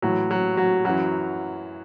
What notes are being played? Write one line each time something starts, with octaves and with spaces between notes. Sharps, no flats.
A2 E3 F#3
F#3
F#3
F#2 E3 F#3